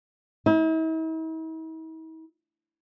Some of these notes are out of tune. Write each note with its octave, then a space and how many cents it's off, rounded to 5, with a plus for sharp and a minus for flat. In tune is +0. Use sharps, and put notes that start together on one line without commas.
E4 -45